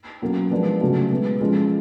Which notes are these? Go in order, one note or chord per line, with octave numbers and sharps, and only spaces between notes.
B2 F#3 A#3 C#4
F3 G#3 B3 D4
C#3 F#3 A3 C#4 F#4
B2 G#3 B3
F3 G#3 C#4 F4 A4